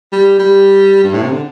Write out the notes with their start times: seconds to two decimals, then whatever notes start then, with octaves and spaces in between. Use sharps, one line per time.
0.12 G3
0.39 G3
1.04 G2
1.13 A2
1.23 C3
1.32 D3